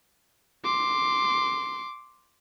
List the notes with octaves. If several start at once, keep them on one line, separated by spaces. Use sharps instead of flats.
C6 D6